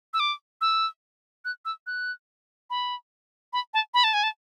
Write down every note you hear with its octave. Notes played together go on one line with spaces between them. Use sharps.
E6
D6
E6
F#6
E6
F#6
B5
B5
A5
B5
A5
G#5
A5